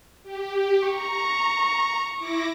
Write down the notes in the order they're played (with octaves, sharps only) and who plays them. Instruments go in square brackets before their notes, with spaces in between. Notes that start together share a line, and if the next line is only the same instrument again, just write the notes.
[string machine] G4
[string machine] A#5 [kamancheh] C#6
[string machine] E4 D6 A#6